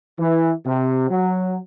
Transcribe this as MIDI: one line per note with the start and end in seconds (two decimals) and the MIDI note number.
0.19 0.52 52
0.65 1.07 48
1.10 1.57 54